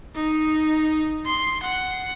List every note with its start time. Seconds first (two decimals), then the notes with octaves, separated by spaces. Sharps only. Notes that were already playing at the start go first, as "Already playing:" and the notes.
0.15 D#4
1.26 C6
1.63 F#5